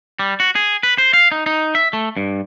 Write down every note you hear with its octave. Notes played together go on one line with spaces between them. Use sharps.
G3
F#4
G#4
B4
C5
F5
D#4
D#4
E5
A3
G2